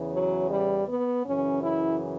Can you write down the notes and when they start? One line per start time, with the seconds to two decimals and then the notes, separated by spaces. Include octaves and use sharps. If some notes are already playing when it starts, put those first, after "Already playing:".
Already playing: E2 C#3 E3
0.13 F#3
0.50 G3
0.88 B3
1.26 F#2 C#3 E3 C#4
1.63 E4